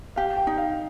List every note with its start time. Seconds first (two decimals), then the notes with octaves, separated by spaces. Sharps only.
0.16 G4 F5
0.37 G5
0.47 D#4
0.58 F5